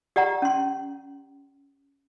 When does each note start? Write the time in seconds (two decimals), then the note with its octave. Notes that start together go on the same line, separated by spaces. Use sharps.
0.16 G4 D5 F#5 A#5
0.42 C#4 C6